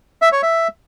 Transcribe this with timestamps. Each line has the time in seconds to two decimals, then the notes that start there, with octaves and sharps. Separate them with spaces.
0.22 E5
0.32 C#5
0.43 E5